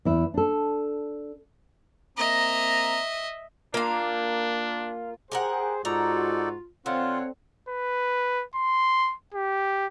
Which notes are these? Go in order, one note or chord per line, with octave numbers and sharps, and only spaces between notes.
E2 E4
D4 A4
A#3 C4 D#5 E5 A#5
A#3 D4 F4 F5
G4 G#4 A#4 C5 F#5
G#2 D#4 F4 F#4 A4 D5 A#5
D3 C4 F4 C#5 F5 F#5
B4
C6
G4